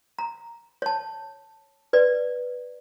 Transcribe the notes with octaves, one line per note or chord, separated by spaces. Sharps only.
A#5
C#5 A5
B4 D5